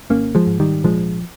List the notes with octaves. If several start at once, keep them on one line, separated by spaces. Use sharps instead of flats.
G#1 A#3 C#4
F3 G#3
G#2
D#3 G3
A#1 F3 G#3